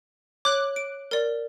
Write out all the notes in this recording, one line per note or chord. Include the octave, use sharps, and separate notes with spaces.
C#5 D6 F#6
D7
A#4 D5